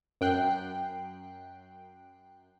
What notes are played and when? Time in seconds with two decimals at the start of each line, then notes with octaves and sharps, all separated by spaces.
0.21 F#2 G5 F#6 C7